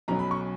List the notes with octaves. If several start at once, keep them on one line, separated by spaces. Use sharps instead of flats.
B1 B2 F#3 C#4 A#5
B5
C#6